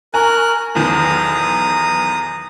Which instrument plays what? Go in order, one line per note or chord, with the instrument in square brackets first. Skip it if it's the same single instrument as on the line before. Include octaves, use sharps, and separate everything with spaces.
[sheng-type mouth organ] A#4 F#6 [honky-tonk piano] G#5 A#5 C#6
[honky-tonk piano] B1 E2 D#3 [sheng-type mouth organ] A#5 D#6